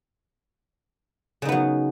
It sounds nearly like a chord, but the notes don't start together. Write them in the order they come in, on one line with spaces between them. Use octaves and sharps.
C#3 D#4 B3 F#3